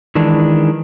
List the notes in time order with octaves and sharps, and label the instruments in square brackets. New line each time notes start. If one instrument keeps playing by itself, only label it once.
[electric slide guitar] D#3 E3 G#3 D4